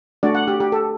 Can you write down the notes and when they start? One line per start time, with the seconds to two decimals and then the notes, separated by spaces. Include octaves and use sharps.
0.23 A3 D4 F#4 D5
0.35 F#5
0.48 G4
0.60 G4
0.72 A4